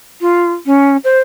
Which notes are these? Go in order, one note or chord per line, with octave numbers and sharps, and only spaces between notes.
F4
C#4
C5